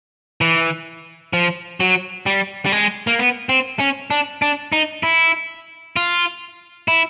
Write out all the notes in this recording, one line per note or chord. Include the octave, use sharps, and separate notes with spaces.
E3
F3
F#3
G3
G3
G#3
A#3
B3
C4
C#4
D4
D4
D#4
E4
F4
E4